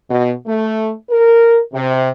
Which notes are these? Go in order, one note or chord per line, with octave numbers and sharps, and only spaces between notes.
B2
A3
A#4
C3